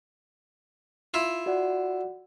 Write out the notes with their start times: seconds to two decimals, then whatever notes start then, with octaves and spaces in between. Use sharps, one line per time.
1.14 E4 F4
1.46 F#4 D5 F#5